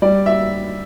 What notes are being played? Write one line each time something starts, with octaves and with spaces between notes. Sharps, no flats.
G3 D5
E5